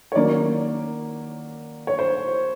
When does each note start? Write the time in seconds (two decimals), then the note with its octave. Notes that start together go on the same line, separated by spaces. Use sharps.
0.12 C#5
0.15 D#3 F#3 A#3 C#4 D5
1.87 C#5
1.99 C5